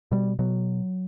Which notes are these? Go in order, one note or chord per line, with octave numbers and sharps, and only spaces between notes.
B2 G3
B2 F#3